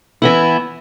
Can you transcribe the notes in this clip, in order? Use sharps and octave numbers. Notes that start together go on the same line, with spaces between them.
E3 B3 E4